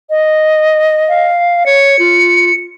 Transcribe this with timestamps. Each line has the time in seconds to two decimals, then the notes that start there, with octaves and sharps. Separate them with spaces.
0.10 D#5
1.08 F5
1.66 C#5 C#7
1.99 F4